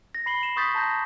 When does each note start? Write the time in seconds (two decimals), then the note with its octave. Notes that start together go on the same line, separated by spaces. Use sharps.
0.15 A#6
0.26 B5 C7 F#7 G7
0.43 E7
0.56 C6 C#6 D#6 G6 A6 B6
0.75 A5 A#5 G6 A#6